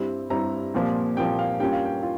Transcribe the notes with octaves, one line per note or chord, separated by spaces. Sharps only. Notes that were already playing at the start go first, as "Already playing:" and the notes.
Already playing: G2 G3 C4 E4
G2 G3 C4 E4 A#5
C2 A#2 F3 A#3
C2 A#2 F3 A#3 G5
F5
G2 G3 A#3 C#4 F4 G5
F5
G5
F4